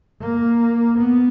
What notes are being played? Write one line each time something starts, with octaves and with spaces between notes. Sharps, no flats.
A#3
B3